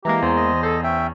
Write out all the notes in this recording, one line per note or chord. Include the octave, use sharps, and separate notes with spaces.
E3 G#3 A#3 G4 A#5
E2 C5
D#5
A4 C5
C#4 E5 G5